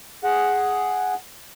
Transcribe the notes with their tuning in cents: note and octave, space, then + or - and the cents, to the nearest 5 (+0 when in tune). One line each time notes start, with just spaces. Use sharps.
G#4 +0 F#5 +0